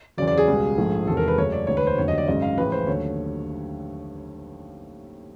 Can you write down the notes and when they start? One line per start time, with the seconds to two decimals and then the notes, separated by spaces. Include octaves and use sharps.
0.17 E2 C#3 F#3 D5
0.27 D5
0.38 G#4
0.48 C#2 B2 G3
0.78 A#1 G#2 F3 A3
1.07 E1 E2 C3 D#3 A4
1.17 A#4
1.28 B4
1.38 F#2 C#3 F#3 A3 C#5
1.52 D5
1.67 E1 D2 D3 C#5
1.77 B4
1.87 C5
1.98 F1 D#2 D3 F#3 C#5
2.08 D#5
2.18 D5
2.28 G#1 F#2 C#3 D#5
2.42 F5
2.58 A1 A2 F3 G#3 B4
2.72 C5
2.87 D#2 D3 F#3 A3 C#5